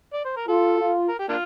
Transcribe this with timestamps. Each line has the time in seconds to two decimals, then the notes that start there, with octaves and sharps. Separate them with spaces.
0.13 D5
0.25 C5
0.37 A#4
0.48 F4 A4
0.79 F4
1.09 A#4
1.19 G4
1.29 A#3 D4 F4